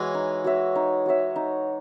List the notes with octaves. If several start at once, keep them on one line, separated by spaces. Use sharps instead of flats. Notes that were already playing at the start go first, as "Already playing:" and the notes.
Already playing: E3 G#3 F#4 C#5
D#4
F#4 C#5 E5
D#4
F#4 C#5 E5
D#4